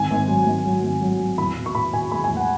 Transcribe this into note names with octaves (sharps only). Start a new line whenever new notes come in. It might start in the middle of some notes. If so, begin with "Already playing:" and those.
Already playing: G#1 G#5
G#1
F#3
G#1
F#3
G#1
F#3
F#3
E2 B5
B2
C#6
B2 B5
B2 G#5
G#3 B5
G#5
E2
F#5